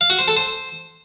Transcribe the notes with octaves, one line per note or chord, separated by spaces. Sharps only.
F5
F#4
C5
A4
C5